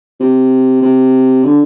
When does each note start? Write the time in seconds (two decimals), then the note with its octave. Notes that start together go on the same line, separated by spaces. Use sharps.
0.20 C3
0.82 C3
1.44 D3